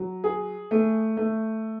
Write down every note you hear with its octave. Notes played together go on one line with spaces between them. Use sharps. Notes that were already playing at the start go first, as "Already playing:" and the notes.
Already playing: F#3
G#4
A3
A3